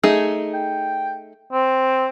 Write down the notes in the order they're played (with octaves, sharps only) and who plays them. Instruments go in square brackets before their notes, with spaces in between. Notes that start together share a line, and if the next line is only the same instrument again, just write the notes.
[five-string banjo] A3 D#4 G#4
[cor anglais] G5
C4